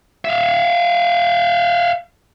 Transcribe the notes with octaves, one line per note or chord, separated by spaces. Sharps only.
E5 F5